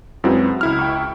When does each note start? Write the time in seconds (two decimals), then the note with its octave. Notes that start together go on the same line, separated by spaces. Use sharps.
0.24 F#2 G#3 C4 E4 F#4 B4
0.61 C#2 E4 F6
0.79 G5 C#6